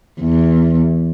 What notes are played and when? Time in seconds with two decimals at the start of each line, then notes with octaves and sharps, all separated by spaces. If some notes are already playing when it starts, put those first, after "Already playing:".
0.21 E2